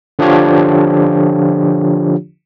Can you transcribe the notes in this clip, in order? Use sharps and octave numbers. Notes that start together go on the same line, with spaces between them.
D3 F3 D4 F4 G4 C#5